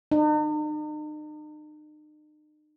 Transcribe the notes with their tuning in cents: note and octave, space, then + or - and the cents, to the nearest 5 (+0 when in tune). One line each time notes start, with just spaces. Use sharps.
D#4 -45